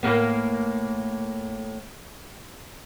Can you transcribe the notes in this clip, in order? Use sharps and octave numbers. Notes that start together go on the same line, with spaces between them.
A2 A#3 B3